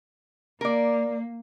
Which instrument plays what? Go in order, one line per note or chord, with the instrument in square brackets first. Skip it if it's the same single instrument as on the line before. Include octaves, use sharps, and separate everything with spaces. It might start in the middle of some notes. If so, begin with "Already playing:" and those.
[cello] A#3 [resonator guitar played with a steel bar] A#4 D5